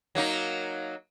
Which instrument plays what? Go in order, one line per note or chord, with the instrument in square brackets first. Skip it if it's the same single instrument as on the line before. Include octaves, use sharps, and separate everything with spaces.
[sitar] F#3 A#3 D#4